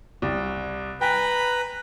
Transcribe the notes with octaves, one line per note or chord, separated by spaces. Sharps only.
C2
B4 G5 G#5 A#5 B5